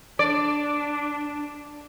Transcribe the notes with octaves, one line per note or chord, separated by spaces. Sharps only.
D4 D5